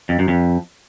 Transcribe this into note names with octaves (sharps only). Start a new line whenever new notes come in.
F2
F#2
F2